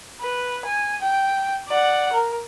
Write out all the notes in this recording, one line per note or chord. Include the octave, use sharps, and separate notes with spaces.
B4
G#5
G5
D5 F#5
A#4